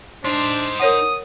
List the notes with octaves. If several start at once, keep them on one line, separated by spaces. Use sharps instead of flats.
D4 D#4 C5 C6
A#4 C#5 F#5 D#6